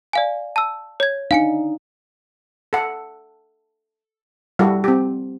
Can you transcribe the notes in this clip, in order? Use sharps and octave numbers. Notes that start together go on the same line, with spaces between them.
D5 F5 G#5
A5 E6
C#5 G#6
D4 D#4 F5 G#5 C#7
A4 F#5
G3 E4 F#4 A4
C4 G4